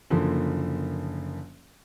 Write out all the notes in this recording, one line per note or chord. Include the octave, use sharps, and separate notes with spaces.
F#1 D3 F3 A#3